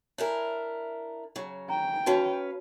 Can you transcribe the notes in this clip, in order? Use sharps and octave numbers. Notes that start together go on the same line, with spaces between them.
D4 E4 A#4 C#5 G#5
C#3 F#3
G5 A#5
C#4 D#4 F#4 B4 F5 A5